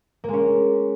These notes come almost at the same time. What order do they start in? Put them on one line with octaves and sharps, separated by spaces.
A#3 G#3 C#4